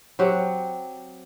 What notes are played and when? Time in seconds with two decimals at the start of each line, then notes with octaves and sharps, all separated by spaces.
0.19 F#3 C4 G4 F#5